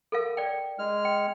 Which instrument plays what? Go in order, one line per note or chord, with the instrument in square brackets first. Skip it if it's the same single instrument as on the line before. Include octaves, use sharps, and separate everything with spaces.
[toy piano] A4 A#4 F5
D5 G5
[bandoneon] G#3 F6
[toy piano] G5